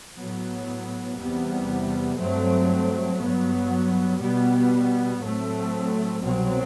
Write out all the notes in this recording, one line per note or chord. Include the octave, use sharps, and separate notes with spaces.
A2 F#3 B3
E2 C3 G3 B3
G2 F#3 A3 C4
G2 F#3 B3
B2 G3 B3
A2 F#3 A3 C4
C2 B2 F#3 C4